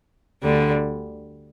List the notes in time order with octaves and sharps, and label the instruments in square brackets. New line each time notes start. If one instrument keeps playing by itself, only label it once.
[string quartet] D2 D3 G3